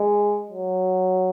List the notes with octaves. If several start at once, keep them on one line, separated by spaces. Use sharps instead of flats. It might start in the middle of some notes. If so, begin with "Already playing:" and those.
Already playing: G#3
F#3